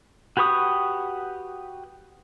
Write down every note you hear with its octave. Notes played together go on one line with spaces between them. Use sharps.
F#4 G4 B4 C#6 D#6